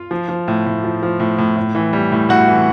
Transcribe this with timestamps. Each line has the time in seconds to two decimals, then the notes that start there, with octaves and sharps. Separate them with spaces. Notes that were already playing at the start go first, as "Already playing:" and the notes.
Already playing: F4 F5
0.11 F3
0.29 F3
0.48 A2
0.66 A2
0.84 F3
1.03 F3
1.20 A2
1.38 A2
1.57 A2
1.75 E3
1.93 G3
2.12 A2
2.29 A2 F#4 F#5
2.48 E3